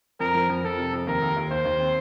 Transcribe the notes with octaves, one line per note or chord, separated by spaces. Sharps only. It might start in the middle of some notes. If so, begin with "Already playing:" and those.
F2 A#4
F3
F2
F2 A4
C3
F2
D#2 A#4
D#2
D#2
D#2 C5
D#2
C4